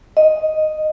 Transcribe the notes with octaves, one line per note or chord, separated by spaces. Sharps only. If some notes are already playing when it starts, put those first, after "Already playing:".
D#5